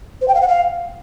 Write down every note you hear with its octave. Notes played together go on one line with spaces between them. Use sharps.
C5
G5
F5
F#5
F5